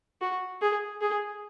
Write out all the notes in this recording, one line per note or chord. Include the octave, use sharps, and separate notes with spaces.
F#4
G#4
G#4